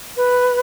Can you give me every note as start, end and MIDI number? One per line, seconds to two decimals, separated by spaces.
0.16 0.59 71